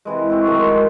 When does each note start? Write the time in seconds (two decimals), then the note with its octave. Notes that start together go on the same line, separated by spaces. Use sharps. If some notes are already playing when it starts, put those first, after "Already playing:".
0.05 C3 E3 G#3
0.30 C4 F#4
0.47 D#3 F#3 G#3 A3